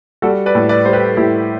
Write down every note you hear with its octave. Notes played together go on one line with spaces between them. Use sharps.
G3 F#4 A4
B4 D5
A2
B4 D5
G3 C5
G4 B4
A2 E4 G4